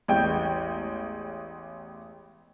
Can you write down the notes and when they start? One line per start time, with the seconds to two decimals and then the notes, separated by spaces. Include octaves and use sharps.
0.08 A1 E2 G#3 G5